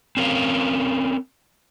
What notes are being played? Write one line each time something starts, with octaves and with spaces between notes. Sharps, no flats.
C4 C#4 A#4 F5